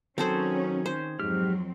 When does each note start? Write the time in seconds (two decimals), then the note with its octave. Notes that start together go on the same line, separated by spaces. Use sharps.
0.18 D#3 F#3 C4 C#4 G#4 A4 C5
0.86 C5
1.19 F2 G#2 F#3 C4 G4 F6